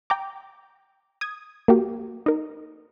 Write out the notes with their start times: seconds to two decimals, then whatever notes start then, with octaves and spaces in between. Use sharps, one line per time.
0.10 G5 A#5 D6
1.21 D#6 G#6
1.68 A#3 F#4 G4
2.26 D#4 A#4